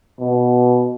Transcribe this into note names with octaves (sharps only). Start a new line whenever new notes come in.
B2